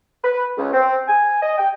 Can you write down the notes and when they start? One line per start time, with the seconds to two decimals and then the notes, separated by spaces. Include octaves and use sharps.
0.24 B4
0.57 C#2
0.73 C4
1.08 G#5
1.42 D#5
1.58 G5